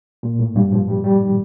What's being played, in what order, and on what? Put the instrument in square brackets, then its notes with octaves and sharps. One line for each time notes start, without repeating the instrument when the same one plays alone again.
[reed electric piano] A#2
A2
G2
F3
G3
G3
D#3